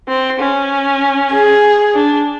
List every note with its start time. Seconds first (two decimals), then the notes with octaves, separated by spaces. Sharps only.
0.08 C4
0.39 C#4
1.32 G#4
1.95 D4